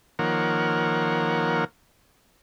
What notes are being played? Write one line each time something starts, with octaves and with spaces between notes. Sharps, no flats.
D#3 F3 A#3 A#4 C#5 F#5